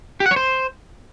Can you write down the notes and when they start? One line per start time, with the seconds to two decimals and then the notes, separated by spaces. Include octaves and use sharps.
0.20 G4
0.26 F#5
0.31 C#5
0.36 C5